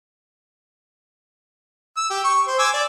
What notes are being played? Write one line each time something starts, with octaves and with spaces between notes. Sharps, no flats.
E6
G4
C#6
C5
G#5 D6 E6
D5